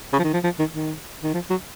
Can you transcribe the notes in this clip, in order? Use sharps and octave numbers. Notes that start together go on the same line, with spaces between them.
C#3
F3
D#3
F3
F3
D#3
D#3
D#3
F3
F#3